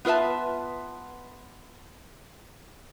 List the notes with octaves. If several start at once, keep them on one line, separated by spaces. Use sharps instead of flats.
B3 F4 B4 E5 A5